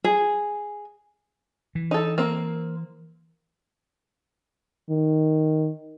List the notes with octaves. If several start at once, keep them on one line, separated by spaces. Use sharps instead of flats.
G#4
E3
D#4 A4
A#3 C4
D#3